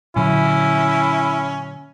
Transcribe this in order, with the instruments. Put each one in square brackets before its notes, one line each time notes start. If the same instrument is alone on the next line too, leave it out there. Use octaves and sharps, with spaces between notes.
[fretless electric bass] A#2 D3 F#3 [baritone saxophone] C#4 [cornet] E4